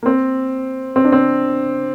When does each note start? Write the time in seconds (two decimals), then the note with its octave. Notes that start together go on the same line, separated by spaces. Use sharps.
0.03 A#3
0.06 C4
0.96 C4
1.04 D4
1.12 C4